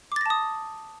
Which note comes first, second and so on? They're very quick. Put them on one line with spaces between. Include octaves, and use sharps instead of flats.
D6 A6 A#6 A5 D#6